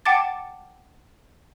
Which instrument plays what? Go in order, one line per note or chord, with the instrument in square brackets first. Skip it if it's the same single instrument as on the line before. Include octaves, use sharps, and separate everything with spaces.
[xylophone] F#5 G5 A5 D6 A6